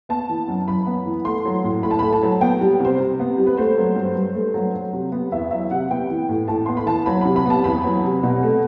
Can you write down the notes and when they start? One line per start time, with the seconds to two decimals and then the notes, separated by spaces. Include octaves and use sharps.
0.09 B3 A5
0.29 E3
0.48 F#2
0.68 F#2 B5
0.87 B3
1.06 E3
1.25 A3 C6
1.46 F#3
1.64 A2
1.83 A2 B5
1.91 A5
1.99 A3 B5
2.13 A5
2.23 F#3
2.41 B3 G5
2.61 G3
2.80 C3 C5
3.00 C3
3.20 B3
3.38 G3
3.47 B4
3.57 A3 C5
3.78 F#3
3.96 G2
4.15 G2
4.35 A3
4.54 F#3
4.74 F#3
4.93 C3
5.12 B3
5.32 E2 E5
5.51 F#3 E5
5.71 C3 F#5
5.91 B3 G5
6.10 E3
6.29 A2
6.48 A2 A5
6.66 B3 C6
6.77 B5
6.87 E3 A5
7.06 F#3 B5
7.21 C3 B5
7.36 B5
7.46 B3 A5
7.64 E2 B5
7.85 F#3
8.03 C3
8.23 B2
8.43 A3